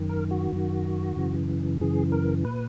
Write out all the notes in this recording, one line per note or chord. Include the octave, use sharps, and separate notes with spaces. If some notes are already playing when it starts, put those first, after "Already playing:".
Already playing: F#2 D#3
A#4
F#4
F#2 D#3
F#2 C#3 E3
F#2 C#3 E3 G#4
A#4
A#2 B4